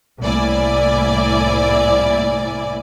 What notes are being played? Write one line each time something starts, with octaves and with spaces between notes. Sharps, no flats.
C2 A2 A#3 E4 D5 G#5